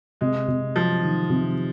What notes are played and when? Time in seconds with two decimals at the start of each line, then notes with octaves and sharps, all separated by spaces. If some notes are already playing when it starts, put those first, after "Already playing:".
0.21 C3 G#3
0.48 C3
0.76 F3 F#3
1.03 D#3
1.30 C3